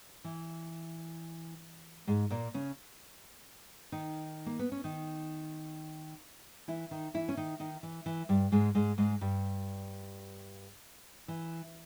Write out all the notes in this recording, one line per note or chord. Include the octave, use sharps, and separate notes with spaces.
E3
G#2 G#3
A#2 A#3
C#3 C#4
D#3 D#4
A#3
B3
C#4
D#3 D#4
E3 E4
D#3 D#4
E3 E4
C#4
D#3 D#4
D#3 D#4
E3
E3
G2 G3
G#2 G#3
G#2 G#3
G#2 G#3
G2 G3
E3